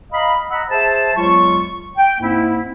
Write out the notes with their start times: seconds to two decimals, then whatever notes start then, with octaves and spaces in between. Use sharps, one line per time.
0.12 D#5 F5 A#5 B5
0.51 D#5 F#5 A#5 B5 E6
0.70 G#4 C5 E5 A5
1.16 E2 F#3 G#3 F4 C#6
1.98 G5
2.21 G#2 A#3 C4 E4